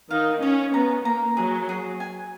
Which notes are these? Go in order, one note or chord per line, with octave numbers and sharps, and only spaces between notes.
D#3 D#4 F5
C#4 C#5
B3 A#5
A#3 A#5
F#3 G#4
G#4
G#5